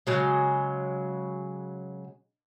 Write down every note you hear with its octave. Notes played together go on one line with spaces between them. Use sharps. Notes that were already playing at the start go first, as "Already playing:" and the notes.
C#3 F#3 G#3